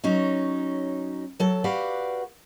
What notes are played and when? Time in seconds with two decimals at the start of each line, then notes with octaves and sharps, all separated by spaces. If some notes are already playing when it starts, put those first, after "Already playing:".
0.04 F#3 C#4 D#4
1.40 F#3 A4
1.64 F#4 G4 B4 D5 F5 F#5